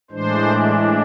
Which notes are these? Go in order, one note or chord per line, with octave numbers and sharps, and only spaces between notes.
A2 E3 G#3 D4 C5